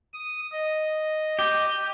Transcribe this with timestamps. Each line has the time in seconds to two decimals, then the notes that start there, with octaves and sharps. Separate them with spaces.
0.14 D#6
0.52 D#5
1.39 G4